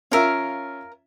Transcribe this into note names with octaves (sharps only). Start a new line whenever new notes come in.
C#4 F4 A#4 E5 F5